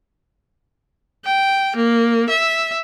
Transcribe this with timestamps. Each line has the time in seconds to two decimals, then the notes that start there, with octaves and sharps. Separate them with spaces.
1.25 G5
1.76 A#3
2.29 E5